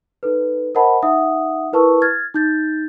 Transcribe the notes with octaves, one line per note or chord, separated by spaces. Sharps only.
D#4 A4 B4
A#4 C5 D#5 F#5 A5 B5
D#4 E5 F#5 D#6
E4 A#4 B4 A5 C#6 E6
F6 G#6 A6
D#4 G6 A6